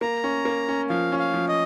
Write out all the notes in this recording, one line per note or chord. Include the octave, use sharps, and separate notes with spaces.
A#3 A#5
C#4
A#3
C#4
F3 F5
C#4
F5
F3
D#5